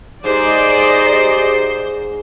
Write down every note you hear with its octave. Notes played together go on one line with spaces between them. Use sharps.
G#2 D#4 G4 G#4 C5 D5 D#5